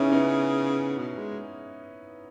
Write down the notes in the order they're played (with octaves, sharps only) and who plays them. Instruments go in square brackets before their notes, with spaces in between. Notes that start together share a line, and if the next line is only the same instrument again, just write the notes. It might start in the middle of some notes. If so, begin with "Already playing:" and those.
Already playing: [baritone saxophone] C#3 [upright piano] B3 C#4 D#4 E4
[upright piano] B3 D#4
[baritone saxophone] B2
G#3